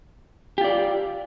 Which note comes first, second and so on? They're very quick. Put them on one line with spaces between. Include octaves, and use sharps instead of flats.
G4 F4 D5